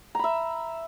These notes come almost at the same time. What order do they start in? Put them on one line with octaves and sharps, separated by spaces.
A#5 B5 E5